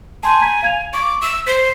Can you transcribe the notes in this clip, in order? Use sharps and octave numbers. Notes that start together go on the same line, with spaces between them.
G#5 A5 C6 G6
A#5 G#6 B6
F5 G#6 F7
C#6 D6
E6
C5 B6